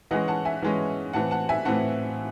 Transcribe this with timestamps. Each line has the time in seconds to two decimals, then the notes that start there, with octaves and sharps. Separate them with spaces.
0.11 E3 G#3 C#4 D#5 F#5
0.28 F#5 A5
0.45 E5 G#5
0.62 E3 G#3 C#4
1.13 A2 E3 C4 F#5 A5
1.31 F#5 A5
1.49 E5 G#5
1.65 A2 E3 C4 F#5 A5